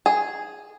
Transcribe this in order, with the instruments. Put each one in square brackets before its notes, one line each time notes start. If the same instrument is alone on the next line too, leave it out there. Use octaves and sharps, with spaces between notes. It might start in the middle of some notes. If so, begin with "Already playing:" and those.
[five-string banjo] G#4